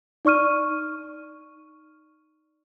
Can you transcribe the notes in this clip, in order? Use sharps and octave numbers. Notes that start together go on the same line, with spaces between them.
D#4 D5 C#6 F6 D#7